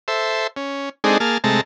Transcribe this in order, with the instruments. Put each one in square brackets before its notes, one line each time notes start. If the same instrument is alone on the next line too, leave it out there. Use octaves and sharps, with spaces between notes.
[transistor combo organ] A4 C5 E5
C#4
G#3 C4 D4 D#4 G#4 A4
A#3 G#4 A5 F6
C3 G#3 A3 A5 A#5